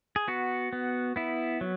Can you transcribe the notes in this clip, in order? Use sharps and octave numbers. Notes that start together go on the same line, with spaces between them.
G#4
B3 F#4
B3
B3 E4
F#3